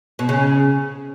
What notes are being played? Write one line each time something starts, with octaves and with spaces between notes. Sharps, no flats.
B2
C#3